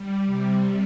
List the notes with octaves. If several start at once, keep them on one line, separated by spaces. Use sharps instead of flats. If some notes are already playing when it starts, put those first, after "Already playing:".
Already playing: G3
C3